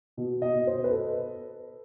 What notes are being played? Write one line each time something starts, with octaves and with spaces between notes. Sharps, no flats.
B2
D#5
B2
C5
B4
A4